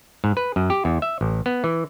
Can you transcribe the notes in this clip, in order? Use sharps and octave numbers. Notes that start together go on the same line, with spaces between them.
G#2
B4
F#2
G4
E2
E5
A1
B3
E3